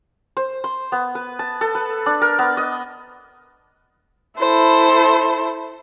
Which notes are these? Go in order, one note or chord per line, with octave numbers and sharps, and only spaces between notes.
C5
C6
B3
B4
A5
A4
B4
D4
A#4
B3
D#5
E4 A4 C5